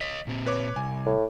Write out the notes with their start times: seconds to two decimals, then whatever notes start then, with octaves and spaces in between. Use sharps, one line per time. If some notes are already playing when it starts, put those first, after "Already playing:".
0.01 C#5 D#5 B6
0.27 A#2 C4
0.46 B4 C#5 D6
0.76 C2 G#5
1.06 A2